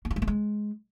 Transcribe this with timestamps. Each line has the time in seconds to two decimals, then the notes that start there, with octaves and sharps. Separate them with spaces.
0.05 A#3
0.11 F4
0.16 G#3
0.22 A#3
0.27 G#3